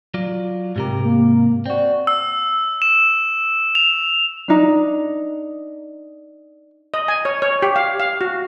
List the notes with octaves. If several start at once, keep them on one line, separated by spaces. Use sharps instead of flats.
F#3 F4 D5
G#2 C3 G4 A#4
A#3
C4 F#4 D5
E6
E7
F7
D4 D#4
D#5
G#5
C#5
C#5
G4
F5
F5
F#4